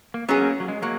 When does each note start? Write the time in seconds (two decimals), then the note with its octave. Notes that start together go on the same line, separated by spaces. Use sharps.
0.14 A#3
0.29 F#3 B3 C#4 G#4
0.42 A#3
0.60 F#3
0.68 G#3
0.82 F#3 A#3